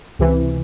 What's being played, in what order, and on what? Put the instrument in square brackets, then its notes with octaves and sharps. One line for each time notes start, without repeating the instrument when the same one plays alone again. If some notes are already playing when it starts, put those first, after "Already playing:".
[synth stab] C#2 C3 E3